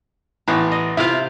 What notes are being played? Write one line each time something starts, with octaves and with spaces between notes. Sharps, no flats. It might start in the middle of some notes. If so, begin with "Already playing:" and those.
A1 A2 B3
D#5
C3 E4 F4 F5 G5